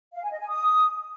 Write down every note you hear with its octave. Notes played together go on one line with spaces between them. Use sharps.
F5
G#5
D#5
G#5
D#6